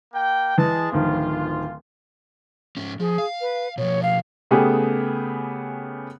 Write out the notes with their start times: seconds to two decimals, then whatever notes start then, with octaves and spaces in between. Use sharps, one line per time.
0.13 A#3 G5
0.58 E3 G#3 G#4 A5
0.92 D1 D#3 F3 F4
2.77 G#2 C#4
3.00 F3 G#4
3.18 F5
3.41 B4
3.78 B2 F3 C#5
4.03 F5
4.51 C#3 A3 B3 G4 G#4